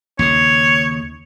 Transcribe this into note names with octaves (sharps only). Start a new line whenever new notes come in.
D#2 C#3 C#5